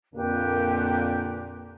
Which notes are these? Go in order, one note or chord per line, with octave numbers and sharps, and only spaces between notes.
F2 A#2 D3 A#3 G4 B4